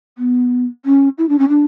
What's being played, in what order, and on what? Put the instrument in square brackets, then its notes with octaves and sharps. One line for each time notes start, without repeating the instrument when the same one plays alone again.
[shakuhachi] B3
C#4
E4
D4
C#4
D4